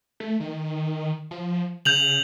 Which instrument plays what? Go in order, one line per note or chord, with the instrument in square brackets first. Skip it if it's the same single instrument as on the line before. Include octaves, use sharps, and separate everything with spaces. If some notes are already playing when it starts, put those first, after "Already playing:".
[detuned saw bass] A3
D#3
F3
[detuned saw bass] C#3 [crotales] G6 F7 F#7